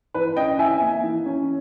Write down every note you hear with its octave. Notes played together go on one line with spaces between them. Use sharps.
E3 B4
C#4 D#5 G5
E3 E5 G#5
A#3
E3
C#4